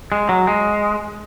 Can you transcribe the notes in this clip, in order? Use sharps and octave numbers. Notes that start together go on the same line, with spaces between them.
G#3
F#3
G#3